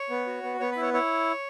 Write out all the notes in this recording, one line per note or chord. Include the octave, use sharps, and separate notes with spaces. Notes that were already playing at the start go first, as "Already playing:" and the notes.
Already playing: C#5
B3
F#4
B3
B3 C#5
E4 B4
C#5
E4 C#5